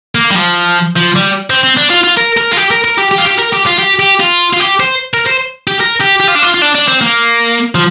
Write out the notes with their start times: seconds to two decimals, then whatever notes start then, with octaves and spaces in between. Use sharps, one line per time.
0.15 A#3
0.31 G3
0.35 F3
0.96 F3
1.16 G3
1.50 C4
1.63 C4
1.77 D4
1.90 F4
2.04 F4
2.17 A#4
2.37 A#4
2.53 F4
2.57 G4
2.71 A#4
2.84 A#4
2.98 G4
3.11 G4
3.18 F4
3.25 G4
3.38 A#4
3.52 G4
3.66 F4
3.79 G4
3.99 G4
4.20 F4
4.53 F4
4.60 G4
4.80 C5
5.14 A#4
5.26 C5
5.68 G4
5.81 A#4
6.01 G4
6.21 G4
6.28 F4
6.35 D4
6.43 F4
6.54 F4
6.62 D4
6.75 D4
6.88 C4
7.02 A#3
7.75 F3